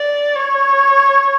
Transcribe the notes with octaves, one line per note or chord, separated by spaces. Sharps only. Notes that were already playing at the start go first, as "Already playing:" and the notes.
Already playing: D5
C#5